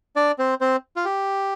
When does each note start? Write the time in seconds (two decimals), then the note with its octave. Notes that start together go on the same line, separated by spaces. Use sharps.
0.16 D4 D5
0.39 C4 C5
0.61 C4 C5
0.96 F4
1.05 G4